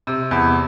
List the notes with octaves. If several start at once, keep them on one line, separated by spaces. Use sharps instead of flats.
C3
E2